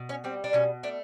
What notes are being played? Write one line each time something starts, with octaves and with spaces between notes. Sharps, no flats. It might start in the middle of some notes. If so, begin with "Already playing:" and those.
Already playing: B2
C#4
G3 C4
D4
B2 C#4
A3 D4